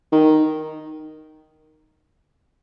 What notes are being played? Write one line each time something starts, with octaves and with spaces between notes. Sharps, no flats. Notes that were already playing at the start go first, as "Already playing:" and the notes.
D#3